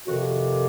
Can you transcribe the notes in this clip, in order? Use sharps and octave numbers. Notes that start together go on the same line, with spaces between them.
F2 C3 D#3 F#4